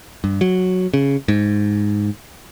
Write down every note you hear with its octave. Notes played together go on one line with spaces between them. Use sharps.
G2
F#3
C#3
G#2